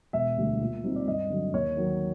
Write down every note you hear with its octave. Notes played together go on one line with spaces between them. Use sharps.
E1 E5
D2 D3 G3
A#2
G3 C4 D#4
D5
G2 D#5
D3 F#3
D#2 C#5
D#3 F#3